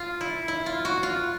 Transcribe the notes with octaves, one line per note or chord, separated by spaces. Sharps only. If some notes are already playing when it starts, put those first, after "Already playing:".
Already playing: F4
E4
E4
F4
F#4
F4